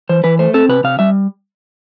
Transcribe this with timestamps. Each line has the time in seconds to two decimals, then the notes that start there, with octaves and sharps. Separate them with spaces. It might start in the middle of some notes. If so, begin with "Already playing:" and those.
0.09 E3 C5
0.24 E3 B4
0.39 A3 C5
0.54 C4 A4
0.69 C3 B4
0.84 C3 F5
0.99 G3 E5